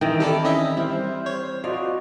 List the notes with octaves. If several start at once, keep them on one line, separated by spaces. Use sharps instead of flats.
D#3 E3 C4 D#4 G5
E4 G4 A4 D5
C#4 D#5 E5
G3 E4 C5 F6
C#5
F4 F#4 D5 D#5 F5